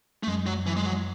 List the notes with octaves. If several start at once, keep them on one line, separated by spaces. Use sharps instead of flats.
A3
F#2 G#3
F#3
E3
G#3
F#3